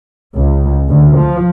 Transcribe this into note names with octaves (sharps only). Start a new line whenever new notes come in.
C#2
D2
F3